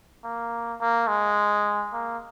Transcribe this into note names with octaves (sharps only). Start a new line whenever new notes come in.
A#3
A#3
G#3
A#3